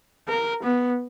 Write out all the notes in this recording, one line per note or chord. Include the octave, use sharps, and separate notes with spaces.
A#4
B3